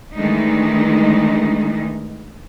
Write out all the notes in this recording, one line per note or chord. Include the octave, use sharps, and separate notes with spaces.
D#3 E3 G#3 A3 D4 D#4